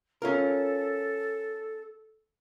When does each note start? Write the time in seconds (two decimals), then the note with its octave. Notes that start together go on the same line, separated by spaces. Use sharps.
0.22 C#4 F4 A4 A#4